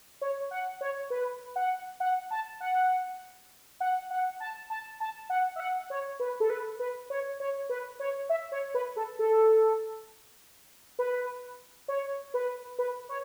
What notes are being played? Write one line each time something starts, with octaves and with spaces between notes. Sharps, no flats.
C#5
F#5
C#5
B4
F#5
F#5
A5
F#5
F#5
F#5
A5
A5
A5
F#5
E5
F#5
C#5
B4
A4
B4
B4
C#5
C#5
B4
C#5
E5
C#5
B4
A4
A4
B4
C#5
B4
B4
C#5